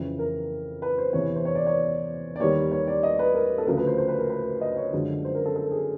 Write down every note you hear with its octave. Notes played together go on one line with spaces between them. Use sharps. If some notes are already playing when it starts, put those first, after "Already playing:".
Already playing: F2 C#3 E3
A#4
B4
C5
E2 C3 E3 C#5
C5
C#5
D5
C#5
D5
D#2 D#3 G3 C#5
C#5
D5
D#5
B4
A#4
A4
D2 C#3 F3 A#4
B4
C5
C5
B4
A#4
B4
D#5
C#5
F#2 D3 F3 G#3
C5
A#4
A4
A4
G#4